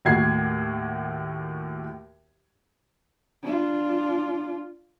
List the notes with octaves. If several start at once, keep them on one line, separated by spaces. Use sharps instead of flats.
D#2 A2 F#4 G#6 C7
D4 F4